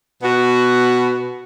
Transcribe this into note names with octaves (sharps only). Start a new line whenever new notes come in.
B2 B3 F#4